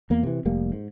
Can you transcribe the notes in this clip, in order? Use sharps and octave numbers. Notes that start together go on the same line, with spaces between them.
E2 A#3
C3 E3
F1 G3 A#3
G#2